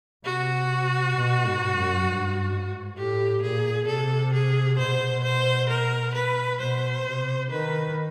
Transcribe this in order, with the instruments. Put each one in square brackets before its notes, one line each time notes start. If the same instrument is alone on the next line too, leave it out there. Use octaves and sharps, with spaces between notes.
[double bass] C3 [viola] F#4
[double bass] B2
G#2
F#2
G2
G#2
[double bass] A2 [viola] G4
[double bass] A#2 [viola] G#4
[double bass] C3 [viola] A4
[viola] G#4
[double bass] B2 [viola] C5
[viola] C5
A#4
B4
[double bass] B2 [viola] C5
[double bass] C3
[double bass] D#3 [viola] B4